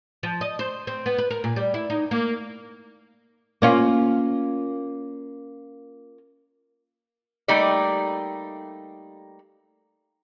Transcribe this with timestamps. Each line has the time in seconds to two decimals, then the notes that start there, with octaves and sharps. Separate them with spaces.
0.23 F3
0.41 D#5
0.59 C5
0.87 C4
1.06 B3
1.18 B4
1.30 A#4
1.44 A#2
1.56 G3
1.74 E4
1.90 D#4
2.11 A#3
3.62 A#3 C#4 F4
7.48 G3 A3 A#3 D#4 G4 D5